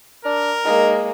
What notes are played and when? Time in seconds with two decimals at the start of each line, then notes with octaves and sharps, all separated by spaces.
0.25 D4 A#4
0.65 G#3 A#3 D#4